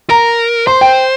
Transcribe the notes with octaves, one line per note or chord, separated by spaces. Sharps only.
A#4 A#5
C5 C6
G5